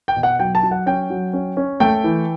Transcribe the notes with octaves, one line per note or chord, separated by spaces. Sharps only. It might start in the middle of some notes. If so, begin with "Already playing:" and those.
G5
B2
F#5
F#3 G5
A5
F#3
F#5
C#4 G5
F#3
C#4
C#4
A3 G5
E3